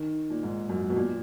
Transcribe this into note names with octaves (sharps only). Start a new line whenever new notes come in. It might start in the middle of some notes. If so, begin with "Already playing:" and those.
Already playing: D#3
A#2
G#2
F#2
B2
A#2